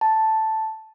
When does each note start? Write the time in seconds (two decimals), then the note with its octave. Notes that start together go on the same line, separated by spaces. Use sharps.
0.01 A5